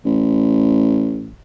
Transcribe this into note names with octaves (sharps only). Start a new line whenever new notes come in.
A1